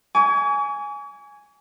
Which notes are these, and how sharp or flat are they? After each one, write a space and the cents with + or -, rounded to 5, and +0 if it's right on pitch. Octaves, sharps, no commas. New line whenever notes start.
G#5 +0 C#6 +45